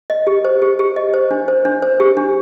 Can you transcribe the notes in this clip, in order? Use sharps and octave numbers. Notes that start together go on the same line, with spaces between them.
D#5
G4
C5
G4
G4
D#5
C5
D4
C5
D4
C5
G4
D4